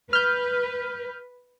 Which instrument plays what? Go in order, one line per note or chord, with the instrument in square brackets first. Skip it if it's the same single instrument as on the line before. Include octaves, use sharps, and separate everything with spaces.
[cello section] B4 [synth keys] F6 G6